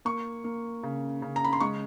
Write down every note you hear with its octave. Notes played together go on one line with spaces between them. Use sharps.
A#3 C#6
A#3
C#3
C#3
A#5
B5
C6
G#3 C#6